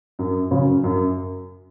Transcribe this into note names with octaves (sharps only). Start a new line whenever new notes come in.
F#2
C#3 F#3 C#4
F#2